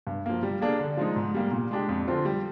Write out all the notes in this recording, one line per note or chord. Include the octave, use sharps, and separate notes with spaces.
G2
F3 A#3
G3
A#3 D4 G#4 D5
D3
F3 G#3 D#4
G#2
G3 A#3
A#2
G#3 D4 G4
F2
D3 F3 C4 F4
G3